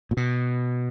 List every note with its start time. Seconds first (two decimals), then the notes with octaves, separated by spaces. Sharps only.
0.11 A#2
0.17 B2